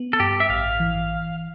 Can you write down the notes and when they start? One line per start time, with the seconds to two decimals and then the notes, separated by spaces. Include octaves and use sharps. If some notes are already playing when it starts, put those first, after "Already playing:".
Already playing: B3
0.13 A4
0.20 G2 G4
0.40 E5
0.50 A1 F5
0.80 E3